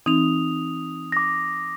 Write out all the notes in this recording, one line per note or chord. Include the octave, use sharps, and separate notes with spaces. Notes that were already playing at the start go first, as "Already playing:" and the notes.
E3 C4 D#4 D#6 F7
D6 A#6